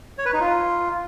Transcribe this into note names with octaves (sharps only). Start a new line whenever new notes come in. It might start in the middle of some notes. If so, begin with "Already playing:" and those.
C#5
B4
D#4
F4